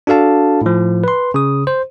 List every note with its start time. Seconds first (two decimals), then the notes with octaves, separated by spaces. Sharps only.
0.07 D4 F#4 A4 F5 A5
0.61 A2 F3
1.04 B4 C6
1.34 C#3 D#6
1.67 C5